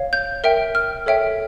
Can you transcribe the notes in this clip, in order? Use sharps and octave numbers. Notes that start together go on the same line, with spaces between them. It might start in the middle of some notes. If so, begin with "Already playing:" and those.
Already playing: C#5 F5
G6
A#4 E5 G5
F6
A4 C#5 E5 G5